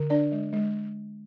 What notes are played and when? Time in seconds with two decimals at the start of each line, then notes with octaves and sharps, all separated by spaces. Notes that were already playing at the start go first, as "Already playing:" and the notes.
Already playing: D3
0.10 D4 D5
0.32 G#3
0.53 G#3